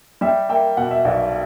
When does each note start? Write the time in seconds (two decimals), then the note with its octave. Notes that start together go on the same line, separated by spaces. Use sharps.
0.21 G3 E5 G5
0.49 A#3 E5 G5
0.77 B2 F#5
0.91 E5
1.05 B1 D5 F#5